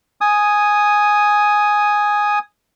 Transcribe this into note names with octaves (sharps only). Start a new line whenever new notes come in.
G#5 D#6